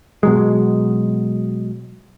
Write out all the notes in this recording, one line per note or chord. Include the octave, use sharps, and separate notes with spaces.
B2 F#3 G#3